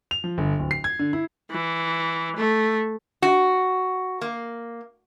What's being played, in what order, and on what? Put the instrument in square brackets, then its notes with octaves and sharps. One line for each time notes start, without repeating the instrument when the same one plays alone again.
[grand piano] F7
F3
G1
D1
C7
G#6
D3
E4
[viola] E3
A3
[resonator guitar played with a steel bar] F#4
A#3